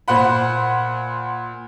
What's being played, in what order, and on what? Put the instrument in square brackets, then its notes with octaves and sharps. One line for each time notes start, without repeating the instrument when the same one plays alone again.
[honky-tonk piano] A#2 C5 F#5 B5